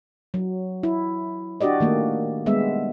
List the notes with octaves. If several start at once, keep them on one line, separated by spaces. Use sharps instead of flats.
F#3
E4
D4 F#4 G4 D5 D#5
D#3 A3 A#3
G3 G#3 B3 E5